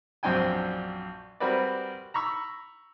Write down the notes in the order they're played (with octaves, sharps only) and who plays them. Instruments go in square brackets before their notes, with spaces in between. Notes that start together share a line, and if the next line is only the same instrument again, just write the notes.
[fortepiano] A#1 F#2 C4 D4 G5 G#5
G3 C4 F#4 A#4 B4 D5
A#5 B5 C#6 E6